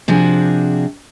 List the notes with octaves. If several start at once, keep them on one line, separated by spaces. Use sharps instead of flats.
C3 F3 D4 F#4 G#4